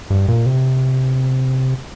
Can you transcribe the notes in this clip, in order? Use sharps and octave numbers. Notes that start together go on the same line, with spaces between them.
G2
A#2
C3